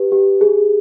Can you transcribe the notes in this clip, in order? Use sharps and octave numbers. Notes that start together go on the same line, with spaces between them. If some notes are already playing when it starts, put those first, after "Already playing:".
Already playing: G4 B4
G4
G#4